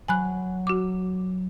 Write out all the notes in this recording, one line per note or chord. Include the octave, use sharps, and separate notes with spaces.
F#3 G#5 B5 F#6
F#4 D6